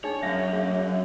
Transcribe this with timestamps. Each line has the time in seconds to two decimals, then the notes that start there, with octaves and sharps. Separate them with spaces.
0.04 D4 D#4 G#4 C#5
0.22 F#2 E5 F5
0.53 G#4 F5